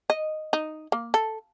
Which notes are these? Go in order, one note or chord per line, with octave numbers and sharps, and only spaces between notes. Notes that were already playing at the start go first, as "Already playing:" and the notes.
D#5
D#4
A#3
A4